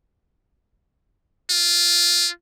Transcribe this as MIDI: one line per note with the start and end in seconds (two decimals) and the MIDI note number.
1.50 2.30 65